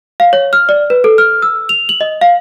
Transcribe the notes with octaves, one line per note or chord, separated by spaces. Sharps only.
F5
C#5
F6
D5
B4
A4
F6
E6
F7
F#7
D#5
F5